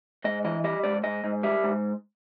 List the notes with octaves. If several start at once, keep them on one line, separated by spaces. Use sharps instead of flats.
G#2 D#5
E3 D#5
G3 D#5
G#2 D5
G#2 D#5
G#2
G3 E5
G#2